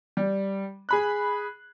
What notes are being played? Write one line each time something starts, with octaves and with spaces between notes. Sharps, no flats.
G3
G#4 B5 F#6